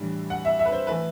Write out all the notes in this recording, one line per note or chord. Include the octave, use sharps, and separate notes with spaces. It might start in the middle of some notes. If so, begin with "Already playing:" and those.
Already playing: A2 E3 G3 D4
F#5
E5
E5
B4
C5
E3 A3 B4